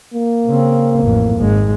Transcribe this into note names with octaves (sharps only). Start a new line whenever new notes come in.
A#3
C#3 C4
A1 F2
G#1 G#3